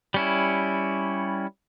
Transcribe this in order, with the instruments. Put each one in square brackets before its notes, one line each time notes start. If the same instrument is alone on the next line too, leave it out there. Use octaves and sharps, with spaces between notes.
[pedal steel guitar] G3 C#4 E4